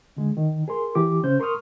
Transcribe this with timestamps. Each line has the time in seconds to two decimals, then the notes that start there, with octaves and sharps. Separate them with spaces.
0.17 D3 G#3
0.37 D#3
0.68 G#4 A#4 C6
0.95 E3 G4 D6
1.23 C#3 C#4 C5 G6
1.40 A#4 C6 C#6 D#6 F6